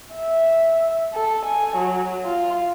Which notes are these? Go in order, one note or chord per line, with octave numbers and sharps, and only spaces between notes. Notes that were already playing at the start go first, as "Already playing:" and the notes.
E5
A4
G#5
F#3
F4